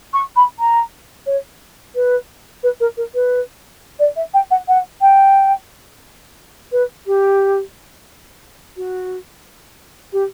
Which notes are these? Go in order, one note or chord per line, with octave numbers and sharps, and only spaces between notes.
C#6
B5
A#5
C#5
B4
B4
A#4
A#4
B4
D5
E5
G5
F#5
F#5
G5
B4
G4
F#4
G4